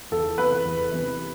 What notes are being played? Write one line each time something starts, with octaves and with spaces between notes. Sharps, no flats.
E2 A4
C3 E3 B3 E4 B4
E2
C3 E3 B3 E4